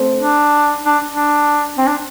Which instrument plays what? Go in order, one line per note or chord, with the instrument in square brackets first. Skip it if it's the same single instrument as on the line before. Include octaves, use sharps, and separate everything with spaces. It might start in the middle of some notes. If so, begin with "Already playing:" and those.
Already playing: [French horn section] A3 C4 A4 C5
[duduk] D4
D4
D4
C4
D4